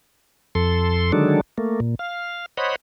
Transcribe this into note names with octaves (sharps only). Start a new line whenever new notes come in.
F2 A4 C6
D3 D#3 F#3 G#3 D4 A4
A3 A#3
A#2
F5
C5 C#5 D#5 F#5 B5